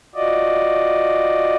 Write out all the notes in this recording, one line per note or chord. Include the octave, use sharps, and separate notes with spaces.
F4 F#4 D5 D#5